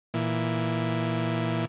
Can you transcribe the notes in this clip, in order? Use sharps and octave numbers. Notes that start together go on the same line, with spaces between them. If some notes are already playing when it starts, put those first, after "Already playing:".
A#2 E3